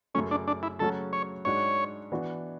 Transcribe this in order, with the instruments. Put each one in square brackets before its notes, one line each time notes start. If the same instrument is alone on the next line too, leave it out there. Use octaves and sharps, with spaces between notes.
[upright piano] F#2 C#3 F#3 A3 [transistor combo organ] C#4
[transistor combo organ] D4
D4
E4
[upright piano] C#3 F#3 A3 C#4 F#4 [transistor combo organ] A4
[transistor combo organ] C#5
[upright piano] G#2 G#3 D4 F#4 [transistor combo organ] C#5
[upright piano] E3 B3 D4 F#4